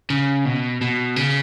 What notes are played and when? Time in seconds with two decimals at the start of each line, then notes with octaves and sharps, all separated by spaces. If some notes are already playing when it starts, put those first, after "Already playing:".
0.10 C#3
0.45 B2
0.82 B2
1.16 C#3